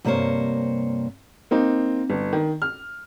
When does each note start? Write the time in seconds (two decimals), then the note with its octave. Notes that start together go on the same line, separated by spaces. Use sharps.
0.05 G2 C3 A#3 C5 C#5
1.51 A#3 C4 D#4
2.10 G1
2.33 D#3
2.62 F6